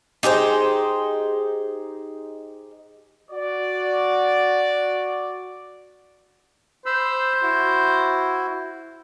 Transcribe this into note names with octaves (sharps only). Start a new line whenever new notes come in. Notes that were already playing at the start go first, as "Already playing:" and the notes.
D#4 G4 G#4 C5
F#4 D5
C5 B5 E6
E4 F#4